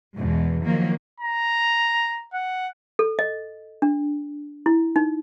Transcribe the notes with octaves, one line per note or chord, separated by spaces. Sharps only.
E2 G#2 B2
D#3 F3 F#3 A#3
A#5
F#5
A4
D#5
D4
E4
D#4